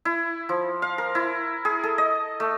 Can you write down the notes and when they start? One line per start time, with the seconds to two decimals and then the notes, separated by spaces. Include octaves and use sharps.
0.05 E4
0.49 F3
0.82 F5
0.98 A#4
1.15 E4
1.65 G#4
1.83 A4
1.98 D#5
2.40 A3